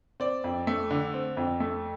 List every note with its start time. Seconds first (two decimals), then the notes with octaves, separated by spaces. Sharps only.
0.20 C4 D5
0.44 F2
0.67 A3
0.91 D3
1.14 C4
1.37 F2
1.60 A3